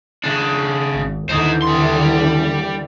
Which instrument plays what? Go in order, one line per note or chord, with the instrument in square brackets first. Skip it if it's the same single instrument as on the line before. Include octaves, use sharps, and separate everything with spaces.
[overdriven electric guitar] C#3 D4
[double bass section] G#1
[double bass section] D#2 D3 E3 [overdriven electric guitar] D#4 C5
[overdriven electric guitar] G3 C6